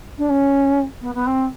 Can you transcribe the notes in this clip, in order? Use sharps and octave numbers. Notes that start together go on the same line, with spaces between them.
D4
C#4
B3
B3
C4